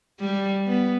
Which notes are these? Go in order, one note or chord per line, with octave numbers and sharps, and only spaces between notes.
G3
B3